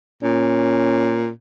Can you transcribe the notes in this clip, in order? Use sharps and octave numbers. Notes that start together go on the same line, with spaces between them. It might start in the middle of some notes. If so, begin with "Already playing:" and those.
A#2 C#4